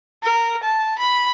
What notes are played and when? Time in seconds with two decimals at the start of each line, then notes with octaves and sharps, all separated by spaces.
0.23 A#4
0.64 A5
0.99 B5